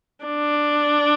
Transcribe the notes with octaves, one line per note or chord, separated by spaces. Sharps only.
D4